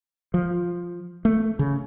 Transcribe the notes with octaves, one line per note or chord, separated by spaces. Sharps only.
F3
A3
C#3